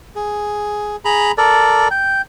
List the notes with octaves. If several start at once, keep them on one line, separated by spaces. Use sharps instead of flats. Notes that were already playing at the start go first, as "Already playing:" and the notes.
G#4
G#4 A#5 B5
A4 A#4 D5
G5